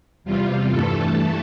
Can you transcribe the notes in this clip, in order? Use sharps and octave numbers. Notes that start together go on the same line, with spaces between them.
E2 C3 G3 F4
G2 E3 A3 A4